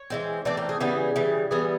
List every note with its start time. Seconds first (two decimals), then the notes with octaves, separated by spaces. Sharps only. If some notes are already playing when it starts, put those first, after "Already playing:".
Already playing: C#5
0.10 E3 G#3 C4
0.45 E3 A3 C4 D5
0.57 A#4
0.69 G#4
0.80 C#3 E3 G3 B3 G#4
1.16 C#3 E3 G3
1.51 E3 G3 B3 G#4